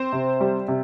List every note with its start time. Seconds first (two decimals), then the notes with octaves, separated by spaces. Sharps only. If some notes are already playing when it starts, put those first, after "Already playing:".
Already playing: C4 C5
0.12 C3
0.40 G3
0.68 C3